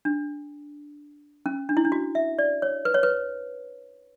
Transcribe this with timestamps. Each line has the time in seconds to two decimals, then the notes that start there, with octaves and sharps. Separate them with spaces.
0.05 D4
1.46 C#4
1.69 D4
1.77 E4
1.85 D4
1.92 F#4
2.15 E5
2.38 D5
2.62 C#5
2.85 B4
2.94 C#5
3.03 B4